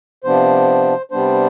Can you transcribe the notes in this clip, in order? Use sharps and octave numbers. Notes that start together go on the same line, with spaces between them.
C3 F3 B3 D4 C5
C3 G3 B3 D4 C5